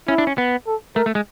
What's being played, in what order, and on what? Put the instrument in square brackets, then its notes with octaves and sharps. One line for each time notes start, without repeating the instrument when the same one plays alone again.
[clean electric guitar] C#4 [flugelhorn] E4
[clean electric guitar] D4
C#4
B3
[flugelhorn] A4
[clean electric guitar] A3 [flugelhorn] A#4
[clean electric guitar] A3
G#3